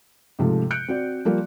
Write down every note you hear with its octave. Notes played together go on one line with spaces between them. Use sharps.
G#2 C3 F3 A3
F#6 G6 C#7 D7
C4 F#4 D5
F3 G3 A#3 F4 D5